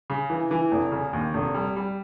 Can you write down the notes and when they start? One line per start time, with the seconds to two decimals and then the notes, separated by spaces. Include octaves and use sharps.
0.10 C#3
0.30 E3
0.51 E3
0.72 F1
0.92 C#3
1.13 D#2
1.34 F1
1.54 G3
1.76 G3